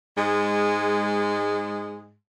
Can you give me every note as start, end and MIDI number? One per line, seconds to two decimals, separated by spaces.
0.17 2.14 44
0.17 2.14 56